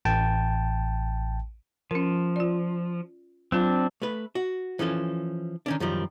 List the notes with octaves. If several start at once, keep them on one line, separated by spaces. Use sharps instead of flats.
A1 G5 A5
F3 C#4 A#4
F4 D5
F#3 C4 D4 F4
A3 B4
F#4
E3 F3 C#4 A4
D#3 C#4 D4
F#2 D#3 F3 G3